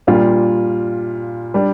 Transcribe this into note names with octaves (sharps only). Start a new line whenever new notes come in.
A#2 G3 D4 F4
G3 D4